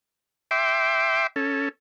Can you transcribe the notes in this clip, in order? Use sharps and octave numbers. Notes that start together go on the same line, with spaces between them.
E5 G5 C6 D6
C#4 A4